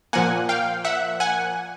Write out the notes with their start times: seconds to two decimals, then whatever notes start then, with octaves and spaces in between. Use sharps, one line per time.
0.13 A#2 F3 A#3 F#5 G#5
0.49 F5 G5
0.85 E5 F#5
1.20 F#5 G#5